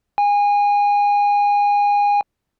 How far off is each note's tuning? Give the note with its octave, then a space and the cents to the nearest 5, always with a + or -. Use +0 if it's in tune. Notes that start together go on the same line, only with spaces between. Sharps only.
G#5 -25